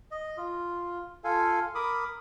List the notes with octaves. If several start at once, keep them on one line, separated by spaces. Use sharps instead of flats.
D#5
F4
F4 A4 F5 G#5
A#4 B5 D6 D#6